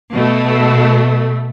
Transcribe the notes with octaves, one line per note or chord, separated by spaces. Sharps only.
B2 A3